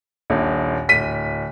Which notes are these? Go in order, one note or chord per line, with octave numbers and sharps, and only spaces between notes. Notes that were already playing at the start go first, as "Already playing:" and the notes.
D#1 A#1
D1 B6 D#7